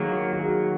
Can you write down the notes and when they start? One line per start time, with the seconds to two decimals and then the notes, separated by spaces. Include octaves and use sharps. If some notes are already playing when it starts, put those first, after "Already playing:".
Already playing: D#3 F#3 A#3 G#4
0.12 F#4
0.33 F#4
0.39 G#4